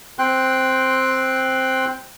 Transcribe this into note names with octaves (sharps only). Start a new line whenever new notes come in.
C4 G5 C6 F#6